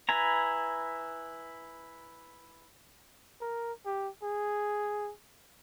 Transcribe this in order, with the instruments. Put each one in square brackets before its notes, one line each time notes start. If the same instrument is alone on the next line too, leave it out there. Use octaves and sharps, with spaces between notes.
[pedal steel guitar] E4 B4 G#5 A#5
[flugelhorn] A#4
G4
G#4